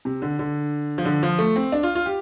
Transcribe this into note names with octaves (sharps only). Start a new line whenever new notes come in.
C3
D3
D3
F3
D3
F3
A3
C4
D4
F4
F4
G4